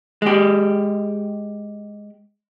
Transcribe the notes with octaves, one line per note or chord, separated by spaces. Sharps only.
G#3 G4